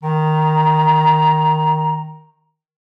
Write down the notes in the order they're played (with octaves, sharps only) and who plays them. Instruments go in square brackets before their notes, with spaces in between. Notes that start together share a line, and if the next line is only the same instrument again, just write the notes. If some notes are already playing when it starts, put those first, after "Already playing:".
[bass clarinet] D#3 [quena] A#5